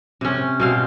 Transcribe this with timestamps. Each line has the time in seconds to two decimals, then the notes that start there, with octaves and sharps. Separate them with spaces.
0.21 C3 C#4
0.60 B2 C4 F5